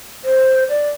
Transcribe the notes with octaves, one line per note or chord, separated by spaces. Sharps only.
C5
D5